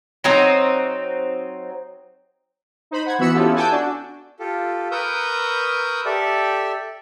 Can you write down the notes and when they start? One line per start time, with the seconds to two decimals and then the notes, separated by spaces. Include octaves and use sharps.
0.24 F#3 C4 D#4
2.91 D#4 C5 B5
3.06 F#5 G#6
3.19 E3 B3 F#4 B5 E6 C#7
3.34 B3 C#4 E4 F4 G4 A4
3.54 F#5 G#5 A5 D6 E6 G6
3.71 D4 F#4
4.39 F4 G4 A4
4.91 A#4 B4 C#6 D#6 E6 G6
6.05 G4 A4 D5 E5